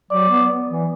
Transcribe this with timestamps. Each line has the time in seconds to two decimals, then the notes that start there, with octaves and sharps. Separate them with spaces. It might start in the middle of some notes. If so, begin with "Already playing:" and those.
0.11 F#3 D5
0.30 B3
0.69 E3